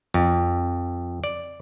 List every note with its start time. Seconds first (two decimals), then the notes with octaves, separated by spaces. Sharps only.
0.14 F2
1.24 D5